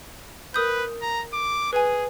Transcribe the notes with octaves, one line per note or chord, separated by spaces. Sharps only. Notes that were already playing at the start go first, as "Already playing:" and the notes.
A#4 B4 D#6 G6
A#5
D6
G#4 B4 G#5